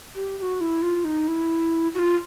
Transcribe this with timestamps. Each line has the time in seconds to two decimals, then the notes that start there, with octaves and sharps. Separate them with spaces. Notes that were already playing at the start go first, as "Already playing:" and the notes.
0.15 G4
0.38 G4
0.42 F#4
0.61 E4
0.82 F4
1.05 D#4
1.28 E4
1.94 F#4
1.99 F4